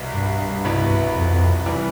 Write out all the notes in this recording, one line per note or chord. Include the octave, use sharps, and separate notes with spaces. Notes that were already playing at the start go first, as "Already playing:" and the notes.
Already playing: C2 B2 G3 B3
G2
C2 B2 B3 E4 B4
F2
C3 E3 G3